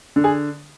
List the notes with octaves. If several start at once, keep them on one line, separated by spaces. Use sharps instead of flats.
D3
G#4